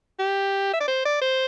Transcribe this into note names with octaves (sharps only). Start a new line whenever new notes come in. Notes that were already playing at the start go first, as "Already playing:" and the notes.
G4
E5
D5
C5
D5
C5